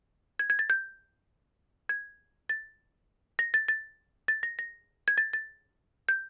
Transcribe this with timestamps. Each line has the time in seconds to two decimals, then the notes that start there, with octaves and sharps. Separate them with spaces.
0.39 G#6
0.50 G#6
0.59 A6
0.70 G6
1.89 G#6
2.49 A6
3.39 A#6
3.54 A6
3.68 A6
4.28 A6
4.43 A#6
4.59 A#6
5.08 G#6
5.18 A6
5.33 A6
6.09 G6